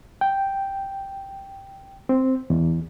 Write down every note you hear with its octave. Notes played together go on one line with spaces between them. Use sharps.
G5
C4
E2